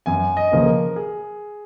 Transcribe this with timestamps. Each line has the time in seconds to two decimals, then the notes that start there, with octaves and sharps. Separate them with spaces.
0.06 F#2 G#5
0.37 D#5
0.52 C#3 F3 A#3
0.66 A#4
0.96 G#4